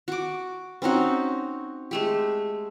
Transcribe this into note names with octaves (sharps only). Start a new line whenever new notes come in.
F#4 D6
C4 C#4 D#4 F#4
G#3 A3 G4